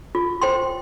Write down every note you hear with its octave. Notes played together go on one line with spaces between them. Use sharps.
F4
C5 G5 C6